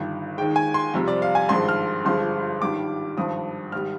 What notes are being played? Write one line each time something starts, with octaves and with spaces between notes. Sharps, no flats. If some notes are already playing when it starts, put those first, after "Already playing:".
Already playing: G1 G2 D#3
D#2 D#3 G#3 G5
G#5
C6
F2 C3 G3
D5
F5
G#5
G#1 G2 F3 G#3 C6
F6
G1 G2 F3 G#3 C6
G#1 G2 D#3 G3 D6
G#1 G2 F3 D#6
G#1 G3 F6